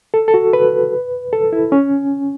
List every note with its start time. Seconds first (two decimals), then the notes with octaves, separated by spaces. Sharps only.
0.14 A4
0.28 A4
0.34 F#4
0.53 B4
1.33 A4
1.53 E4
1.72 C#4